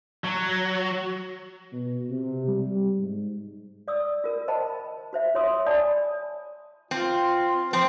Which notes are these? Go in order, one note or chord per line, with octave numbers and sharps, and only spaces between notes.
F#3
B2
C3
G3
G#2
D5 D#6 E6
F4 A#4
C5 D#5 G5 A5 B5
F#4 C5 E5
F4 C#5 C6 D#6 E6
D5 G#5 A5 B5 D#6
C4 F4
F3 C4 C5